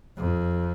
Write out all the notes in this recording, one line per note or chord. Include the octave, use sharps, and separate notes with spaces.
F2